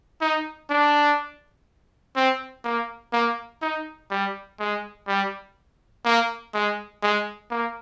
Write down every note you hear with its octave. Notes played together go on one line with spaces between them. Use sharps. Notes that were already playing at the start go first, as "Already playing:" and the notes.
D#4
D4
C4
A#3
A#3
D#4
G3
G#3
G3
A#3
G#3
G#3
A#3